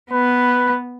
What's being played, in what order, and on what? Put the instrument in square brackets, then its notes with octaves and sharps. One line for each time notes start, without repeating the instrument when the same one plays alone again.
[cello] B3 [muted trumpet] B4